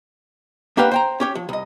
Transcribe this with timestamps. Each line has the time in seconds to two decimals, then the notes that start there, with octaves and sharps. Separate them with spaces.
0.77 A#3 D4 G4 B4 F5 F#5
0.91 C5 G5 A#5
1.20 C#4 G4 C#5
1.35 F3
1.49 C2 D#5